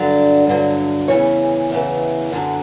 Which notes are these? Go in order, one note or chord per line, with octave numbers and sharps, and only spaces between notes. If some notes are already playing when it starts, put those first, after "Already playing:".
Already playing: G2 D3 F#3 D5
G2 D3 F#3
E2 C#3 E3 C#5
E2 C#3 E3
F#2 D3 F#3